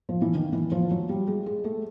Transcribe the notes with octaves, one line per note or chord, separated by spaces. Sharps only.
F3
E3
D#3
E3
F3
F#3
G3
G#3
G#3
A3